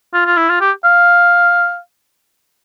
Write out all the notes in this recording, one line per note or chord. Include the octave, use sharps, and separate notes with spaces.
F4
F4
E4
F4
G4
F5